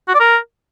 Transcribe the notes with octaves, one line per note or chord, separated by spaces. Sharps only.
F#4
D5
A#4